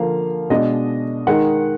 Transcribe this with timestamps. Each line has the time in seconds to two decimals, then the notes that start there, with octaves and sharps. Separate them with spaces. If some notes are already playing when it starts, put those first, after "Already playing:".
Already playing: D3 F3 A#3 F5
0.50 B2 G#3 D4 D#5
1.27 D#3 G#3 D#4 F#5